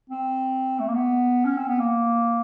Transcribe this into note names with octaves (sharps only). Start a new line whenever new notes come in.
C4
A3
A#3
B3
C#4
C4
B3
A#3